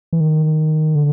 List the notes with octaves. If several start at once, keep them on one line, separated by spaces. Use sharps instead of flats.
E3
D#3
D3